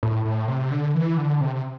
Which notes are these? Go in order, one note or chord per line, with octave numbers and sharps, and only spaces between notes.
A2
A2
C3
D3
E3
D3
C3